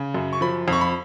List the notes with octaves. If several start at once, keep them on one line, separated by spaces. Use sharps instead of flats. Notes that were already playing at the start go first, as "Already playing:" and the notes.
Already playing: C#3
F#2
C#6
F3 B5
F2 C#6
B5